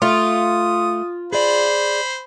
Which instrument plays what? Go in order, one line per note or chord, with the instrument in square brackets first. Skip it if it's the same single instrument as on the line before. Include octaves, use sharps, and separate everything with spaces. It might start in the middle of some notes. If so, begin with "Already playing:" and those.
[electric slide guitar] A3 [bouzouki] F4 [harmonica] D#6
[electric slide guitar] G#4 D5 [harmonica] C5 B5